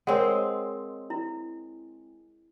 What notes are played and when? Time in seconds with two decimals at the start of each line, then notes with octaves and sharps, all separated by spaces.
0.07 G#3 C4 A#4 C#5 F#5
1.10 E4